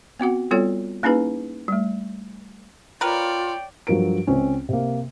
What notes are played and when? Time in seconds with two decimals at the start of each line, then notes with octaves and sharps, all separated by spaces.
0.20 B3 C4 F#4 F#5
0.51 G3 B3 C4 F4 A4 C#5
1.03 A#3 C#4 D#4 E4 G#4 B4
1.68 G3 A3
3.01 F4 A#4 B4 C#5 D5 G5
3.87 G2 F3 F#3 A#4 D7
4.27 C#2 C4 C#4
4.69 C3 A#3